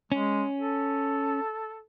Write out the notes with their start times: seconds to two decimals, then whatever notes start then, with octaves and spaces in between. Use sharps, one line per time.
0.12 G#3 C#4
0.59 A4